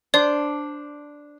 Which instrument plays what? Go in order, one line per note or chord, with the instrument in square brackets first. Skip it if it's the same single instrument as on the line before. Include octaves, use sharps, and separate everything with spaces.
[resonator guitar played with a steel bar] D4 C5 [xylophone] D5